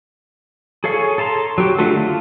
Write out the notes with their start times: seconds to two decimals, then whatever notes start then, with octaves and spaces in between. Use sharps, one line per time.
0.84 G#4 A4 C#5 F5
1.18 A4 A5 A#5 C6
1.58 F#3 G4
1.78 D3 A3 F4 F#4 A4
1.97 F4